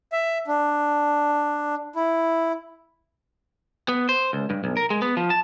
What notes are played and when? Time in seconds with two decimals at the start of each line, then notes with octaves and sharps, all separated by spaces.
0.12 E5
0.47 D4
1.95 E4
3.88 B3
4.09 C5
4.33 C#2
4.50 G2
4.64 B1
4.77 A#4
4.90 G#3
5.02 B3
5.17 F3
5.30 A5